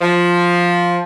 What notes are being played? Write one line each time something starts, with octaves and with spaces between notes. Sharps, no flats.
F3